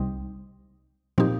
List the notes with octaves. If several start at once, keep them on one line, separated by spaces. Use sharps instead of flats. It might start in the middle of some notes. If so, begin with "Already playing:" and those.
Already playing: C2 C3 G3 C4 D#4
A#2 F3 C4 D#4 G4